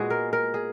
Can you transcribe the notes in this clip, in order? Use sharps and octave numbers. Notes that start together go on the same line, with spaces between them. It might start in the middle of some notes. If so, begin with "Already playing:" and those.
Already playing: A#2 G#3 B3 F#4 G#4
A#4
A#4
G#4